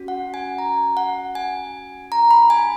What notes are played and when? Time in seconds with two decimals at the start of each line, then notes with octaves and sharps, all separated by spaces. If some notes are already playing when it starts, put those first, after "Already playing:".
Already playing: C#4 F#4
0.08 F#5
0.34 G#5
0.58 A#5
0.97 F#5
1.35 G#5
2.12 A#5
2.31 B5
2.50 G#5